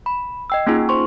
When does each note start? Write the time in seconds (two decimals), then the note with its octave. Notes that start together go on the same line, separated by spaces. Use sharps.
0.06 B5
0.50 D#5 G5 E6
0.67 A#3 C#4 D#4 F4 G#4
0.89 C5 C6 C#6